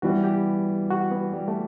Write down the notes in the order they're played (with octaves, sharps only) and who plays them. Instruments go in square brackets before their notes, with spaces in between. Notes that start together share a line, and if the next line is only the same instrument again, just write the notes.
[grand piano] E3 G3 B3 [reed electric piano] F#4
[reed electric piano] G4
F#4
B3
G3
A3